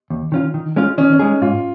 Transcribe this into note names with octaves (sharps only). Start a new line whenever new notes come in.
D#2
D#3 C#4 F4
D#3
G#3 C#4 F4
D#3 C#4
C#4
G#3 D#4 G#4
G#2 F4